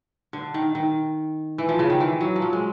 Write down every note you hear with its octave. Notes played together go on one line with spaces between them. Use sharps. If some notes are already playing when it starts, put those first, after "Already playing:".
D3
D#3
D#3
E3
F3
C#3
D#3
E3
F#3
F3
F#3
G#3